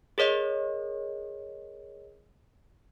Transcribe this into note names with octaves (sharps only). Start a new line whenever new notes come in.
G#4 A#4 C#5 D#5